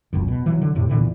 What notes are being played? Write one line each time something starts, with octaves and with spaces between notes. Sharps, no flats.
E1 C#2 F#2
B2
E3 F#3
D3
F2 A2 C3
E2 A#2 D3 E3